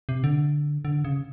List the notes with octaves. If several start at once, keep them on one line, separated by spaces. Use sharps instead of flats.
C3
D3
D3
C#3